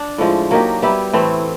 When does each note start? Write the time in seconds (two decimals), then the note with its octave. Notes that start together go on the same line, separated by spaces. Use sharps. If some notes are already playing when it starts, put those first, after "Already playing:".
Already playing: D4
0.18 A2 F3 G#3
0.51 F#3 A#3 D#4 G4
0.82 G3 B3 E4 G4
1.13 A2 E3 A3 C4